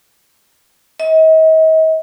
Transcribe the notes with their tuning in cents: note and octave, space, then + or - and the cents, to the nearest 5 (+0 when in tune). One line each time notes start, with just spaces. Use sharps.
D#5 +40